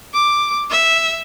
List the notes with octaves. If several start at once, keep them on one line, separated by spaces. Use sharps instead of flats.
D6
E5